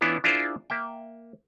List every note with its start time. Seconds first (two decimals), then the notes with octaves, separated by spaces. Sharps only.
0.01 E3 B3 C#4 D4 E4 F4
0.24 D4 E4 F4 G#4 A#4 C5
0.70 A#3 E5 G5